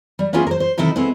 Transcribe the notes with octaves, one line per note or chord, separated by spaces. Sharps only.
G3
A#3 B3 C#4 E4 F4 G#4
A#4 C5
C5
C3 D#3 D#4 E4 A4
G#3 B3 C4 E4 A4